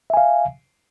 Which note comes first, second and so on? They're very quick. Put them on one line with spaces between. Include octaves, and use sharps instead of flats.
E5 G#5 F5